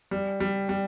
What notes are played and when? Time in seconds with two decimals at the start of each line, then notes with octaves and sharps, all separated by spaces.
0.11 G3
0.40 G3
0.69 G3